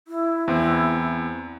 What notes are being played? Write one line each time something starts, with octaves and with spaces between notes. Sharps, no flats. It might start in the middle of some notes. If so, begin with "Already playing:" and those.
E4
E2 C4